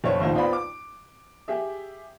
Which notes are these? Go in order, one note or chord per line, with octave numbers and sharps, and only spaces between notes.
F#1 C5 C#5
A#1 D#2 A2 D#4 F4 C5
B3 C4 F4 D5 G5 B5
D6
G4 G#4 E5